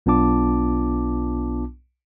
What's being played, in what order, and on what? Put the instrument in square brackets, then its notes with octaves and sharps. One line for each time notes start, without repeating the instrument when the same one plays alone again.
[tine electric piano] B1 B3 D4 F4 A5 D6